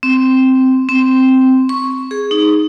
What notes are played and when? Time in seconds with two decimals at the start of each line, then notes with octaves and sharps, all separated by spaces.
0.03 C4
0.89 C4
1.69 C#6
2.11 G#4
2.31 D#4